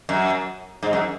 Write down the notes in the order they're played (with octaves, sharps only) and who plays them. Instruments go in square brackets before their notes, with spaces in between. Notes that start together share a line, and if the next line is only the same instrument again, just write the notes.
[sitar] F#2
G#2
F#2